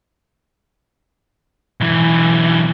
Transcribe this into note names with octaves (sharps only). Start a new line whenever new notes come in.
B1 E3